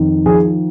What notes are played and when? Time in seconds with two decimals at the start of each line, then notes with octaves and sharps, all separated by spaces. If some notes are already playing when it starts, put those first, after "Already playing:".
Already playing: F2 D#3
0.26 F3 G#4